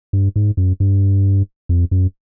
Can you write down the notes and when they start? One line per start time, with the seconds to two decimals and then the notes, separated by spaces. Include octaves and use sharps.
0.13 G2
0.36 G#2
0.57 F#2
0.80 G2
1.69 F2
1.91 F#2